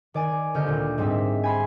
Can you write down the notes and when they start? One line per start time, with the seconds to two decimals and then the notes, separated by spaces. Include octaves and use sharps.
0.14 D#3 D5 G#5
0.54 C2 D3 D#5 F6 G6
0.66 D2 A#2
0.98 G#2 G3 C4 D#5 E5
1.43 G#5 B5 C6